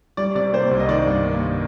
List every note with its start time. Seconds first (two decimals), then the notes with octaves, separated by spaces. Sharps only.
0.17 G3 D5
0.35 C3 D5
0.53 A#3 C5
0.71 C2
0.80 D#5
0.89 D#3 D5
1.06 G2
1.25 A#3